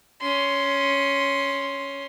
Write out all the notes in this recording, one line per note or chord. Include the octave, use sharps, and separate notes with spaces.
C#4 C6